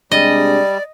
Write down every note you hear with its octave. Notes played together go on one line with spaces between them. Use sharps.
C3 G3 G#3 D4 D5 D#5